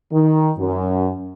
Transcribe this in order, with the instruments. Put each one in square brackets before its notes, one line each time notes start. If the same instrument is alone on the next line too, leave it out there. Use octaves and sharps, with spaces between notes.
[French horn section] D#3
F#2